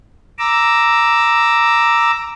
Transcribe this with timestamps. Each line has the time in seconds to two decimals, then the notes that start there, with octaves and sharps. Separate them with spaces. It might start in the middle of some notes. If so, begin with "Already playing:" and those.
0.39 A#5 D6 E6